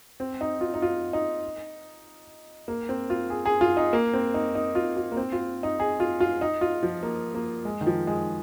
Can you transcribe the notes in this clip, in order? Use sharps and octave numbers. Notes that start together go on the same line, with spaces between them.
C4
D#4
F4
D#4
F4
D#4
A#3
C4
F4
G#4
G#4
F4
D#4
A#3
C4
D#4
D#4
F4
F4
A#3
C4
F4
D#4
G#4
F4
F4
D#4
F4
F3
A#3
A#3
G#3
D#3
F3
G#3